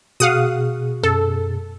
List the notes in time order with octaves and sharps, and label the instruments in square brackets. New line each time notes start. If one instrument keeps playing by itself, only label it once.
[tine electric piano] B2 G#4 [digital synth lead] F#4 [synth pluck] F5 F#5 D#6
[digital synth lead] F#2 [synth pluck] A4